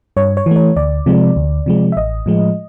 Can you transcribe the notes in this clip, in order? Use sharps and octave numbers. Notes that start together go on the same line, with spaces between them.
G2 C#5
C#5
E3
A3 C#5
D2 D5
C3 F3 G#3
D2
C3 F3 G#3
E5
A1 D#5
A2 F3 G#3